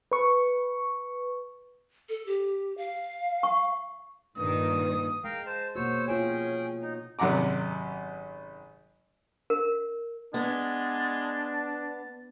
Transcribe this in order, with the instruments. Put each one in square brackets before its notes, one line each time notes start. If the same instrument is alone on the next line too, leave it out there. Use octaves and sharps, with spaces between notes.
[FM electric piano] B4 C#6
[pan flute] A4
G4
F5
[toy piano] C#6
[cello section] G2 A#2 D#3 [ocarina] B4 [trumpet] D#6
[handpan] G#3 [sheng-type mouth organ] A#4 F5 G5
[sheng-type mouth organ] C5 A5
[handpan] B2 A#3 F#4 [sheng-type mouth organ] C5 C#5 E6
[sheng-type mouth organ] C#4 G#4 G5 [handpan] F4 C#5
[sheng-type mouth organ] D#4
[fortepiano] G#1 F#2 C3 F#5 A#5 D6
[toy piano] A#4
[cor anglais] G#3 [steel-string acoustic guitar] B3 [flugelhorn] D4 [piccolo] A6